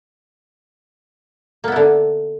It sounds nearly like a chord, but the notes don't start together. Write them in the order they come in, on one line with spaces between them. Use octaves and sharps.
A#3 B3 E4 D3